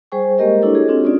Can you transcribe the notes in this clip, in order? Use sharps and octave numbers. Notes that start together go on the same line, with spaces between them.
G3 G#4 C5 G5 G#5 C#6
G#3 A#3 G4 A#4 D#5
D4 E4 G4 A4 C#5
F#4 G#4 C#5
C4 D4 F4 F#4
C#4 D#4 F4 D5